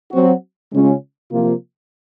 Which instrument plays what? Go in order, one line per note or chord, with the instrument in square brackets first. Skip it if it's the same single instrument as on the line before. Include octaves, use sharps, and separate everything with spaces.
[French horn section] F#3 C4 F#4
C#3 G#3 C#4 F4
C3 F3 A#3 F4